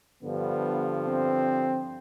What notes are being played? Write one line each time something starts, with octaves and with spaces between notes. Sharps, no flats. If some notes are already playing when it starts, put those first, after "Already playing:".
G2 D3 F3 B3
C4